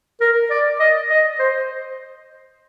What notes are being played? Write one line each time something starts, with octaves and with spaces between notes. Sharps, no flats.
A#4
D5
D#5
D#5
C5